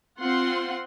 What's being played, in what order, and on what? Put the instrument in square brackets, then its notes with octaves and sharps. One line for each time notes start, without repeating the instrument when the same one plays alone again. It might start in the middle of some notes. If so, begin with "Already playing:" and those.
[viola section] C4 F4 F#5 C6